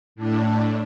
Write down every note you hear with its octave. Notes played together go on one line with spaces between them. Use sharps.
A2 D4